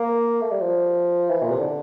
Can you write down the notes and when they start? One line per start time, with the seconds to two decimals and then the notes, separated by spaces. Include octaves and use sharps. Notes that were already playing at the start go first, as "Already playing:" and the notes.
Already playing: A#3
0.41 A3
0.52 G3
0.61 F3
1.30 E3
1.43 A#2
1.51 C3
1.60 D3